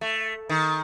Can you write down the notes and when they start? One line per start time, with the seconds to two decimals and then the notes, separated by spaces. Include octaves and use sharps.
0.01 A3
0.49 D#3